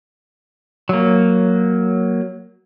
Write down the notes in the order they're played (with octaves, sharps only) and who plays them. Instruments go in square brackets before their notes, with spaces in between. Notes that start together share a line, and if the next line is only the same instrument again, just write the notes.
[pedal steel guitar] F#3 A#3